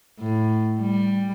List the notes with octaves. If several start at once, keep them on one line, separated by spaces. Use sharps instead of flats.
A2
G3